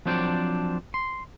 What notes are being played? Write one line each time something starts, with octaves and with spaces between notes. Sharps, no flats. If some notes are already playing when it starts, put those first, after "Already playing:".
F3 F#3 C4 D4 C5 D5
C6